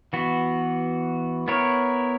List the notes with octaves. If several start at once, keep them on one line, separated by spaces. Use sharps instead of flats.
E3 B3 F#4
B3 E4 A#4 C#5